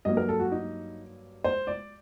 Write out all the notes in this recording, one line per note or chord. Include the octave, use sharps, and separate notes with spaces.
G2 F#3 A#3 D#5
A#4
A4
F#4
D#4
C5
D5